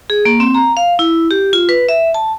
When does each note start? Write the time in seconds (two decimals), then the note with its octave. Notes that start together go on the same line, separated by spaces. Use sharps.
0.10 G#4
0.25 A#3
0.40 C4
0.55 A#5
0.77 F5
0.99 E4
1.31 G4
1.53 F4
1.69 B4
1.89 E5
2.14 A5